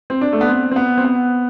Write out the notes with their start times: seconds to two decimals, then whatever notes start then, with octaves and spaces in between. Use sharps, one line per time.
0.10 C4
0.21 D4
0.33 A3
0.41 B3
0.49 C4
0.71 C4
0.76 B3
0.98 C4
1.04 B3